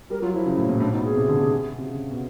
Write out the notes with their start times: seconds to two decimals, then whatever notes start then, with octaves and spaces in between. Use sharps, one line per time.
0.10 G3 A#4
0.22 F#3 F4
0.33 F3 E4
0.46 C#3
0.57 A2
0.69 A#2
0.80 A2 D4
0.92 B2 D#4
1.04 G#4
1.16 C3
1.28 D3
1.40 C3
1.78 C3
1.86 C#3
2.10 B2